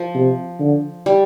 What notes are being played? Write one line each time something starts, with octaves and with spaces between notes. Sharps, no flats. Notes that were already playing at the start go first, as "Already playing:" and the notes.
Already playing: F3
C3
D3
G3